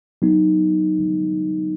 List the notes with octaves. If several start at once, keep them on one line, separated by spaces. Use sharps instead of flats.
F#3 B3 D#4